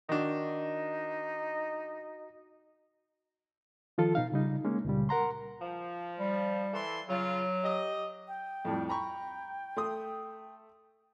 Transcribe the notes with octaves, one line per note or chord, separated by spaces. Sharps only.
D#3 D4 D#4 F#4 D#5
D#3 F3 F4 A4
B2 D#4 F5
C#3 G3 D#4
G#3 A#3 C#4
C#2 A#2 C#3 G3
A#4 F#5 A#5 C6
F3
G3
E3 A4 C6
C#3 F#3 F4
G4 D#5
G5
F2 A2 G3
G5 A#5 B5 C#6
A3 C6 D#6